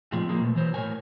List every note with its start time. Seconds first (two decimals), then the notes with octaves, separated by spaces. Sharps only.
0.12 A2 C3 F3 G#3
0.29 F3 G#3 A#3
0.42 B2 E3 A3
0.55 E3 F#3 C5
0.74 A2 A#4 C#5 G#5